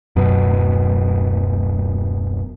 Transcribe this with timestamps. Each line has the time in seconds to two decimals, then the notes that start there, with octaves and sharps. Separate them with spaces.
0.16 D1 F#2 B2